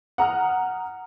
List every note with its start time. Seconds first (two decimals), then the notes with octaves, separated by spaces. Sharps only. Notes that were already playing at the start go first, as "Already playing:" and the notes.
0.18 F#5 A#5 D#6 F6